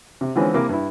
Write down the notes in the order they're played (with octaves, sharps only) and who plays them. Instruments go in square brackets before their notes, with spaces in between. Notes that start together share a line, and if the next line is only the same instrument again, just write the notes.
[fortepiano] C3
D3 E3 F3 G#3 C4 C#4
C3 A#3 E4 D6
G2 E4